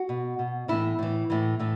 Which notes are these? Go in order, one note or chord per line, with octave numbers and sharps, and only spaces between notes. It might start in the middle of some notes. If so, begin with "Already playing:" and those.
Already playing: F#4
B2
B2
A2 E3 E4
A2 E3
A2 E3
A2 E3